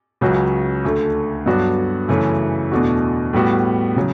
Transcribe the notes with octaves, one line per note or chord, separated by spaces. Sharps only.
C#2 C#3 F#3 C#4 F#4
D2 D3 A3
G2 F#3 B3 D4 F#4
F#2 C#3 E3 A3 C#4
E2 B2 A3 D4 F#4
A2 G3 B3 F#4
C#3 F#3